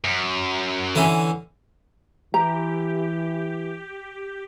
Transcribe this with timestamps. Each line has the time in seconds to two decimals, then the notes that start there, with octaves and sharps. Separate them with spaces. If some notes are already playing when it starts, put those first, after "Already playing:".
0.04 F#2
0.95 D3 E3 C#4
2.34 E3 G4 A#5